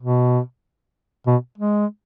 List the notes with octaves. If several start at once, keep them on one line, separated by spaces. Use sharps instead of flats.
B2
B2
G#3